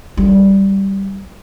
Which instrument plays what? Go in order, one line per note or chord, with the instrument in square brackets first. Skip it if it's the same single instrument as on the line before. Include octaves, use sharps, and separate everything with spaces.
[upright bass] G3